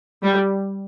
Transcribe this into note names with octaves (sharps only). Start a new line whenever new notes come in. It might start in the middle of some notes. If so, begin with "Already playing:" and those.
G3